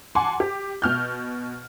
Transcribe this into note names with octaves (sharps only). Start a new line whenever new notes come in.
F#5 G#5 A5 C6 D6
G4
B2 F6 G6